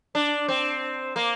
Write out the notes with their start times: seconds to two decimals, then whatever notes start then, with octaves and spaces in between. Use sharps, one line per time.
0.15 D4
0.48 C4
1.16 A#3